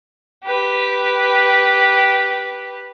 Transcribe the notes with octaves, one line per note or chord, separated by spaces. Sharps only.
G4 B4